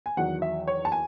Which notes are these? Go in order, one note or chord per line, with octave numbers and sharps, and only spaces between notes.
G#5
E2 D#3 F#3 F#5
E5
C#5
A5
G#5